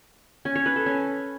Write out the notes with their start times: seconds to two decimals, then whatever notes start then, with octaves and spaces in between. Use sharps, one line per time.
0.45 C#4
0.55 C#5
0.66 B4
0.76 A4
0.86 C#4